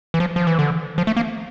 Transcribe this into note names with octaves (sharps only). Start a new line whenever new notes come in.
E3
F3
F3
E3
D3
F3
A3
A#3